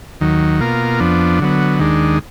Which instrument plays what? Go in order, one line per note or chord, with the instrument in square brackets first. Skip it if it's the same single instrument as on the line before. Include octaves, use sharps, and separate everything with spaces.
[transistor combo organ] D#2 D#3 F#3
B2 A#3 F4 A#4
F2 F3 B3 D4
D3 F#3 B3
D#2 D#3 G#3 D4